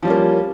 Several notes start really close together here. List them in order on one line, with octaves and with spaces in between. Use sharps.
F3 G3 C#4 A#3